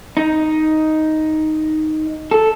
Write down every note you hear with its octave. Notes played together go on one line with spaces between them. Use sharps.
D#4
A4